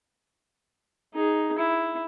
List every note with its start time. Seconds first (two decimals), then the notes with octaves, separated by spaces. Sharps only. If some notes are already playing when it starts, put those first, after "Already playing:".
1.14 D#4 G#4
1.58 E4